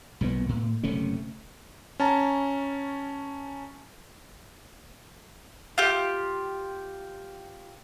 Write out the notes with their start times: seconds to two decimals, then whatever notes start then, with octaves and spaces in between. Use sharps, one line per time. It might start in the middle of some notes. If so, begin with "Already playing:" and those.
0.21 B1 A#2 D#3 B3
0.49 A2
0.83 F#1 C3 A3 C#4
2.00 C#4 A5 A#5
5.78 F4 G4